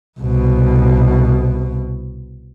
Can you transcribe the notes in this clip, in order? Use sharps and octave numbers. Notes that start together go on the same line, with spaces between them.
C2 B2